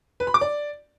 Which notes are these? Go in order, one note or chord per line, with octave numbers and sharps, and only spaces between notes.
B4
B5
D6
D5